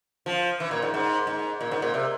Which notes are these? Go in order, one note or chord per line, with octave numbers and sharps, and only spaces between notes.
F3
E3
A#2
G#2
G#2
G#2
A#2
G#2
A#2
C3